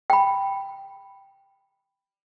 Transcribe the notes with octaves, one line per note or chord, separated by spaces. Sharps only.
G5 B5